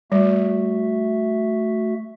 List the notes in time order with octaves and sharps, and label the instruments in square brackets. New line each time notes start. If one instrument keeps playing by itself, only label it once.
[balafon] G3 [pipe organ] A3 F#4 E5